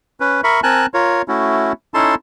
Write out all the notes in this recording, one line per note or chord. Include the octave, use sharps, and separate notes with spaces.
C#4 B4
A#4 E5 B5 C#6
C4 A#4 G#5 A5 F#6
F4 A#4 C#5
A3 C#4 E4 F#4
C#4 D#4 E4 A4 A5 C6